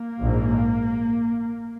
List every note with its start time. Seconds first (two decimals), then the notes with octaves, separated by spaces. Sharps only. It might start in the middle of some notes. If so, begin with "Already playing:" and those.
Already playing: A#3
0.19 A#1 G#2